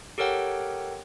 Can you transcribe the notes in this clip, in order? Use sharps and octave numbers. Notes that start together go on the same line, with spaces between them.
G4 A4 A#4 C#5 F#5 G5